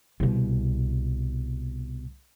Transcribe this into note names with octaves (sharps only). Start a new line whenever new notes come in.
C2 B2